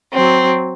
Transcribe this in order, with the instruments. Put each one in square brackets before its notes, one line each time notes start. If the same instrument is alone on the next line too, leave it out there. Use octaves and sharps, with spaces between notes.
[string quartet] F#3 C4